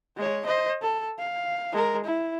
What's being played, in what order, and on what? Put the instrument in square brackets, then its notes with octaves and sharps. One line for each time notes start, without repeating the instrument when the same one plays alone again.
[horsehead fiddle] G#3 C#5
C5 D#5
A4
F5
G#3 A#4
E4